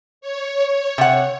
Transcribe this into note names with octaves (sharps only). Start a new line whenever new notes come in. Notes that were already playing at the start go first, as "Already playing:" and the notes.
C#5
C3 F#5